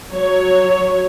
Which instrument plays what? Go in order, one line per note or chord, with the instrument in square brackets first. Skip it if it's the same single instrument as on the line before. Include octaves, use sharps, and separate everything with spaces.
[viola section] F#3 C#5